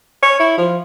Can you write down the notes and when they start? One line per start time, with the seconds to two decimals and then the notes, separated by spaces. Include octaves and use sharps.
0.23 C#5
0.40 E4
0.58 F3